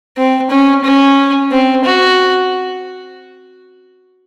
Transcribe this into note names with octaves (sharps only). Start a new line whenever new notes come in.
C4
C#4
C#4
C4
F#4